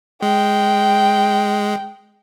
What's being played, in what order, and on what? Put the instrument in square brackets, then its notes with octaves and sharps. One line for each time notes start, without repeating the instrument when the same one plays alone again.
[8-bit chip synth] G#3 [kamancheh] G5